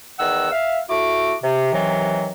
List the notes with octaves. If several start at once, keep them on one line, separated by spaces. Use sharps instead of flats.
E2 D#3 F#5 E6
E5 F5
A3 E4 F#4 D6
C3
C3 D#3 E3 F#3